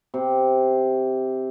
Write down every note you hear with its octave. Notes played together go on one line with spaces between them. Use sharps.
C3